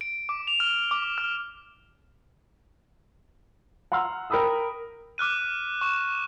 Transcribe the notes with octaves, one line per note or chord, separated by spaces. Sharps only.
D7
D6
F7
F6
D6
F6
F#5 A#5 C6 E6 F6
A#4 G5 B5 D#6 E6
D6 F6 F#6 D#7
C#6 E7